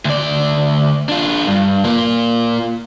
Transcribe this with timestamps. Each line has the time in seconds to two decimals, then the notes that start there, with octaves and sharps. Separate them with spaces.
0.05 D2 D5
1.09 D4 F4
1.47 G2
1.85 A#3 F4